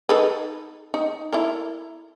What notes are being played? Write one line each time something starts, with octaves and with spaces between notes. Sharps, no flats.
D#4 A4 B4
D#4
E4 A4 A#4